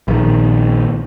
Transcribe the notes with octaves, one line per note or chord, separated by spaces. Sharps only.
A#1 D#3